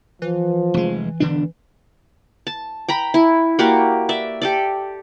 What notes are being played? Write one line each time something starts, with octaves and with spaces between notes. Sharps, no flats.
E3 F3
F1 G#3
E1 D3 D4
A5
G5 A#5 B5
E4
A#3 F#4 G4 D5
D5 E5
G4 A4 D5